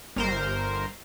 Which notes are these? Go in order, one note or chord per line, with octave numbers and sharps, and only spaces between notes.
G1 A#4 C5